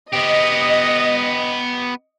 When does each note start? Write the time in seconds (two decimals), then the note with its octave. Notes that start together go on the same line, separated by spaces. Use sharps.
0.13 B3 G4 D#5